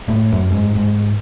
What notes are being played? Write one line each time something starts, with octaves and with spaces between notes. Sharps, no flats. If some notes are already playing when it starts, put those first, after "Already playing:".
A2
F#2
G#2
G#2